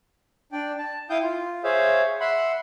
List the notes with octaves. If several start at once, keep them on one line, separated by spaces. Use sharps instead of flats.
D4 D5 G5
A5
E4 F5 G5 D#6 G6
F4
G#4 C5 C#5 E5 F5
E5 F#5 B5 C6